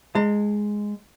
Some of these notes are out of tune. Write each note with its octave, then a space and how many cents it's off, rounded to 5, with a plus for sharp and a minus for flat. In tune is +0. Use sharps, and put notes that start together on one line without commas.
G#3 +0 A5 +45